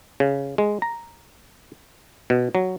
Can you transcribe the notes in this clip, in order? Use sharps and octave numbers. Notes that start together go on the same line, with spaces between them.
C#3
G#3
A#5
B2
F#3